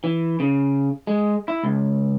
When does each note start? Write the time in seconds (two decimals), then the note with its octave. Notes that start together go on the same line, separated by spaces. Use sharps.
0.04 E3
0.40 C#3
1.07 G#3
1.48 E4
1.63 C#2